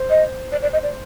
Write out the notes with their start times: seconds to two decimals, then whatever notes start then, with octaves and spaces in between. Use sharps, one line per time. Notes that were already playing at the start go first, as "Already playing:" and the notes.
Already playing: C5
0.10 D#5
0.52 D5
0.62 D5
0.73 D#5
0.83 D5